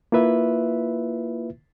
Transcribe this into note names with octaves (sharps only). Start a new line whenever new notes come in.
A#3 E4 F4 B4 E5